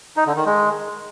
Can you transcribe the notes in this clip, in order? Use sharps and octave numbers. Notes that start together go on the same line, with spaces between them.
D#4
D3
D#3
G#3